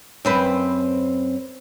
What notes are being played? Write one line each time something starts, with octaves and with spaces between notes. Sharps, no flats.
F#2 C4 B4